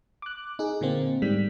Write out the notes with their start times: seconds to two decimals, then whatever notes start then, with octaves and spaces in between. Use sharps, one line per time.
0.22 D6 F#6
0.59 D#4 G#4
0.81 A#2 D3 A#3 C4
1.22 G#2 G3 B6